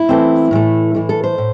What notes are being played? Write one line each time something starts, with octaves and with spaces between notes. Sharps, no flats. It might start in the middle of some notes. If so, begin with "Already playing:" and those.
Already playing: E4
E3 A3 C4
A2 E3 A3
A2 E3 A3
A4
C5
A2